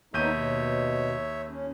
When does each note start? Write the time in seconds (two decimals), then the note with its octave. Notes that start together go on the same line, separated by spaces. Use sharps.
0.14 D#2 B3 D#4 C#5 E5 G6 D#7
0.30 B2
1.50 C#4